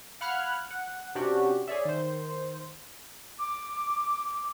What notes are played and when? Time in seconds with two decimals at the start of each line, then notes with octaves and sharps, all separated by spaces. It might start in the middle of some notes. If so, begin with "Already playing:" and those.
0.21 F5 F#5 B5 F6 F#6 G#6
0.70 F#5
1.15 C3 C#4 D4 F#4 G4
1.68 G#4 C#5 D5 E5
1.85 D#3 C5
3.39 D6